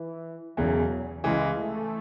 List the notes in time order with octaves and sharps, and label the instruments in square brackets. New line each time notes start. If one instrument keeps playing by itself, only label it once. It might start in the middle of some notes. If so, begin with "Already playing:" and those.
Already playing: [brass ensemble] E3
[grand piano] E1 E2 C#3 E3 [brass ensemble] F#3
[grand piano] C#2 C#3 E3 [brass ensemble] G#3
[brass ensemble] A3